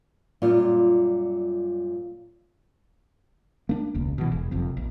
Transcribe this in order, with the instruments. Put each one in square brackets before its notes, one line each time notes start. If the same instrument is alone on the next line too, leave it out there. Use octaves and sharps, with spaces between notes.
[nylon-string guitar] F#2 A#2 G3 F4
[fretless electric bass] A#3 D4
E1 C#2
B2 E3
E1
F#1 F2 C3
A#1